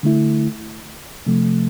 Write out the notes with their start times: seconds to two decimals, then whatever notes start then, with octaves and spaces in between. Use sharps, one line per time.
0.03 D3 A3 E4
1.26 C3 F3 A3